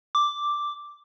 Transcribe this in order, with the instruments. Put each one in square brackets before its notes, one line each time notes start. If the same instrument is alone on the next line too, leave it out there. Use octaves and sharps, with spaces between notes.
[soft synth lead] D6